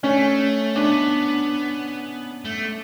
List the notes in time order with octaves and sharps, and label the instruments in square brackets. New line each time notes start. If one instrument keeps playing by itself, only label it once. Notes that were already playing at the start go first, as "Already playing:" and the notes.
[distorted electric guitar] A3 [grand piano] C#4
[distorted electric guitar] B3 [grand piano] D4
[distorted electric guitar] A3